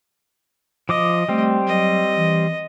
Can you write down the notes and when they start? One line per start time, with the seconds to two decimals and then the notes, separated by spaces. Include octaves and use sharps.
0.89 F3 D#5 D6 D#6
1.29 G3 A3 C4
1.67 F#3 D#5
2.16 E3